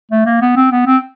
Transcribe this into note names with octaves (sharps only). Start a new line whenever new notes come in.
A3
A#3
B3
C4
B3
C4